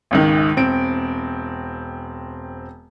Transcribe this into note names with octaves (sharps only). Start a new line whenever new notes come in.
G#1 C#2 D#3
E1 C4 D7